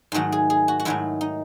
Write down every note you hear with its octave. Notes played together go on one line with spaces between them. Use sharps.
G#2 D#3 F#3 A3 F#4
G#4
G#4
F#4
F#4
G#2 D#3 F#3 A3 E4
D#4